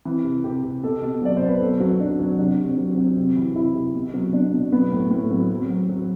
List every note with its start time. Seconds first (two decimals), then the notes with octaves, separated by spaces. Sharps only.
0.05 E3 C4
0.24 C3
0.44 C3 G4
0.63 C3
0.83 B2 A4
1.02 B2
1.21 F#3 D5
1.37 B2 C5
1.49 B4
1.60 F#3 A4
1.80 F#3 F#4
1.99 F#3 D4
2.19 F#3 C4
2.39 C3 D4
2.58 C3
2.64 C4
2.77 F#3
2.91 C4
2.97 F#3
3.17 C3 C4
3.36 E3
3.55 C3 E4
3.75 C3
3.95 B2
4.14 F#3
4.33 B2 D4
4.53 B2
4.72 F#3 B3
4.92 A2
5.11 A2
5.31 F#3
5.50 F#3 C4
5.70 F#3
5.89 F#3